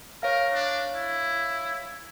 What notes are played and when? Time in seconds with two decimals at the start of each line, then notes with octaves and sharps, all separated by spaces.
0.23 A#4 C#5 F5
0.53 D4
0.95 E4